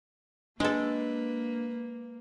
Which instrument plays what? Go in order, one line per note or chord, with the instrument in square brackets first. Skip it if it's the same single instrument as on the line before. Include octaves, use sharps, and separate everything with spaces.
[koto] G#3 A4 [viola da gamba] A#3 [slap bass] D4 [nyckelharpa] B4